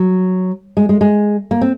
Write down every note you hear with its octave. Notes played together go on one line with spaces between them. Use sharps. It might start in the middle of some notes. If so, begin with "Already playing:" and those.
Already playing: F#3
G#3
G#3
G#3
A#3
C4